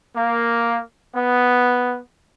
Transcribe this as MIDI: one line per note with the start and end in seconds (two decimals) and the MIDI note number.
0.14 0.78 58
1.13 1.98 59